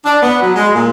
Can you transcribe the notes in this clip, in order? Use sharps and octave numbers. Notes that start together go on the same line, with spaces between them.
D4
B3
F#3
G#3
A#2